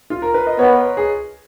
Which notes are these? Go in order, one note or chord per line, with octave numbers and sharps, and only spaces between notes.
F4
A#4
B4
D#5
B3 C#5
G#4